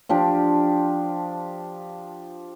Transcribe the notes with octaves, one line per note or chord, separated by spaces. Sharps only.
F3 D4 G4